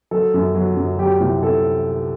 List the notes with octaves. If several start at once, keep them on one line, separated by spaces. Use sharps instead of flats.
F#3 A4
F#2
F#3
F#2
F#3 G4
C2
C3 A4